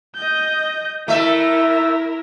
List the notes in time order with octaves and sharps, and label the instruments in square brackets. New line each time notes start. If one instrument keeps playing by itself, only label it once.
[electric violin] D#5 G6
[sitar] A3 E5 [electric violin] E4 A#4